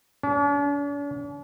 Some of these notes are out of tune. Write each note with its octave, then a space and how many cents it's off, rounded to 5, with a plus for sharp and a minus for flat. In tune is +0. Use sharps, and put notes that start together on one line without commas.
D4 -45